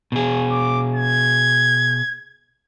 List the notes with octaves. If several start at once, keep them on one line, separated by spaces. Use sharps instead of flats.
B2 G#4
D6
G#6